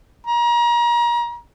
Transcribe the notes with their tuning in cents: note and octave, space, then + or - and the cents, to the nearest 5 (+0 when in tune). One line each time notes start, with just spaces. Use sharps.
A#5 +35